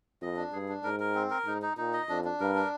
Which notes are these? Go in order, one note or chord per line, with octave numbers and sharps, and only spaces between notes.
F2 D#5
D4
G2 G#4
D4
G#2 A#4
A#4
C4
A#4
G#2 D#4
D#4
A#2 D#4
D#5
F2 D4
D4
G2 A#4
D4